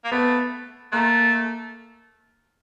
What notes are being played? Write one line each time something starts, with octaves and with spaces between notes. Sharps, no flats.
A#3
A3 B3
A3 A#3